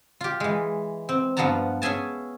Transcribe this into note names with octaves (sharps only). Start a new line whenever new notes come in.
F4 G4
E3 G#3
C4
G2 F3 B3 F#4 A5 A#5
C#4 G#4 E5 G#5 A5